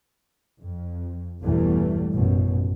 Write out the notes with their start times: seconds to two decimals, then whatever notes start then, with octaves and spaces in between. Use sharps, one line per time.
0.60 F2
1.42 G1 E2 B2 E3 G3 A3
2.13 A1 F#2 B2